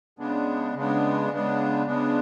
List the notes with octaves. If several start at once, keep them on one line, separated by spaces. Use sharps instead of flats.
C#3 G#3 B3 D4
C#3 G#3 B3 D4
C#3 G#3 B3 D4
C#3 G#3 B3 D4